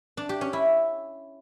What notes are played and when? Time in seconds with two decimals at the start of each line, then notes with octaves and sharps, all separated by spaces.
0.17 D4
0.29 G4
0.41 C#4
0.53 E4